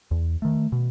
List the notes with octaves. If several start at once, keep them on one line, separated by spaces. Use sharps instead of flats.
E2
D#3 A3
B2